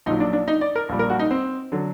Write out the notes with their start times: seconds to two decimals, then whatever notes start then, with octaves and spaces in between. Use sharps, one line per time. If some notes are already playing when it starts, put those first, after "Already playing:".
0.06 A#1 A#2 F#3 D#4
0.20 D4
0.33 D4
0.48 D#4
0.61 D5
0.76 A#4
0.89 A#1 A#2 G3
0.99 A#4
1.10 F#4
1.19 D#4
1.31 C4
1.72 D3 F#3